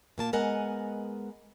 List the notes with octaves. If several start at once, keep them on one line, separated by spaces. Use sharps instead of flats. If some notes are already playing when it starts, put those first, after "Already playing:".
A#2 A#3 A5
G#3 B3 A#4 D#5 F#5 G#5